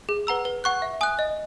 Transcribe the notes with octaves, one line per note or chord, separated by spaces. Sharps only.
G#4
B4 F#5 A#5 E6
B4
F#5 C#6 F#6
E5
G#5 D#6 F#6
D#5